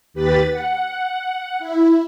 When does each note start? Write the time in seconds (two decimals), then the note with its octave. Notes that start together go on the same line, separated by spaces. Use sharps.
0.14 D#2 G4 B4 B5 A6
0.50 F#5
1.59 E4